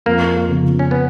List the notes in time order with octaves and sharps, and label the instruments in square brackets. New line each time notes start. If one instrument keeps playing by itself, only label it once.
[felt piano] F2 [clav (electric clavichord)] A#3
[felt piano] C#3 F3 B3 F4
[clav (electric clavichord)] C#4
B3